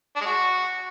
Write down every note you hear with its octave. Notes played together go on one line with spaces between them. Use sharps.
D4
G#3
F#4